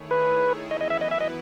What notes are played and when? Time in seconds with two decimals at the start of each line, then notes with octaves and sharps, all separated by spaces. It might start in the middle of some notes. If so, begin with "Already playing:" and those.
Already playing: D#3 A3 E4 G#4 C#5
0.11 B4
0.70 F#2 E3 B3 E4 B4 D#5
0.81 D#5
0.90 E5
1.01 D#5
1.11 E5
1.21 D#5